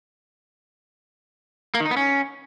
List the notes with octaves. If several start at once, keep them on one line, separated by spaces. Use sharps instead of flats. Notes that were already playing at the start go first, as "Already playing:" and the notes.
A#3
D#3
D#4
B3
C#4